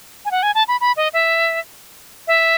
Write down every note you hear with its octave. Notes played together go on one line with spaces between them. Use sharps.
G#5
F#5
G#5
A5
B5
B5
D#5
E5
E5